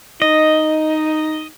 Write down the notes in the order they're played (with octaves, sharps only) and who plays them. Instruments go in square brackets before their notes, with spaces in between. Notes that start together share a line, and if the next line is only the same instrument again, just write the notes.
[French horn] D#4 [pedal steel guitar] D#5